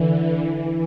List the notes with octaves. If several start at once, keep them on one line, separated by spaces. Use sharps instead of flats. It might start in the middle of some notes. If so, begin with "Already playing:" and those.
Already playing: D3 E3
E3